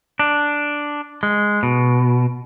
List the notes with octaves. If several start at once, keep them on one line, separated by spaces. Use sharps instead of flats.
D4
G#3
B2